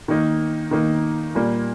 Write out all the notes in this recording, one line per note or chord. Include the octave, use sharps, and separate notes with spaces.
D#3 A#3 D#4
D#3 A#3 D#4
A#2 G3 A#3